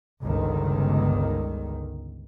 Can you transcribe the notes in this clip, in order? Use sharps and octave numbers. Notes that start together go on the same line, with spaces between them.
G1 C#2 D#3